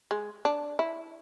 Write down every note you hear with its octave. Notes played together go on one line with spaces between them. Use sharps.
G#3
D4
E4